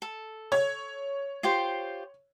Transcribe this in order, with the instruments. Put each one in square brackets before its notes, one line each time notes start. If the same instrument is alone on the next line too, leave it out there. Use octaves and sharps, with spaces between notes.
[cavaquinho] A4
[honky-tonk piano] C#5 G#6
[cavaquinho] F4 G4 C5